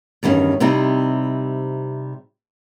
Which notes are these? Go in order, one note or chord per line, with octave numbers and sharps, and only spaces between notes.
E2 G2 D#3 C#4
C3 G3 C4 D#4 E4